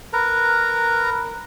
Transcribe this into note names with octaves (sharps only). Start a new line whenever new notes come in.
A#4 B4 A#5